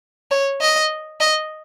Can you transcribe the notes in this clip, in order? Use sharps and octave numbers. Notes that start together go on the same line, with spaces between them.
C#5
D#5
D#5